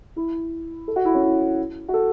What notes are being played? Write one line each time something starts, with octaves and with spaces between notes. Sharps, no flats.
E4
A4
F#4
E4
C#4
E4
F#4
A4